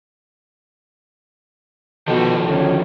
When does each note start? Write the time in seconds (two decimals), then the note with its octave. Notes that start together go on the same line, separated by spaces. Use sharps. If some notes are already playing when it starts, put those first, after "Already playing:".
2.08 B2 D#3 F3 A4
2.45 D2 C#4